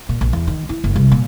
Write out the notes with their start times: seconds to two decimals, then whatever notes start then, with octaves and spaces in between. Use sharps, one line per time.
0.09 A#2
0.21 A#1
0.33 E2
0.47 D#3
0.69 E4
0.84 F#1
0.96 C2
1.12 A#2